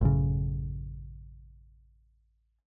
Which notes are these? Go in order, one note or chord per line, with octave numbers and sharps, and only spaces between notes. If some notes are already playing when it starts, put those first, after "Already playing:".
A1 F#2 C#3